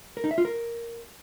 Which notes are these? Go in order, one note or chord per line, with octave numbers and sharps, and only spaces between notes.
A#4
D#4
E5
F4
A#4